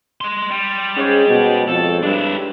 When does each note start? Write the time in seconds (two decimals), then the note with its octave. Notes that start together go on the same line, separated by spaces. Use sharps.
0.21 D#5 C6
0.51 G3
0.96 G#2 C#4 C5 C#5
1.28 B2
1.68 F2 A4
2.03 G2 D4 E4